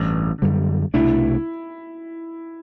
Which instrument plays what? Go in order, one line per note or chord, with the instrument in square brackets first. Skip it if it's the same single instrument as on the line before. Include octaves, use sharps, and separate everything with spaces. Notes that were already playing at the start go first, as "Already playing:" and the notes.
Already playing: [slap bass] A1 G2 E3
F#2 D3 G3
[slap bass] C2 B2 A3 D4 [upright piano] E4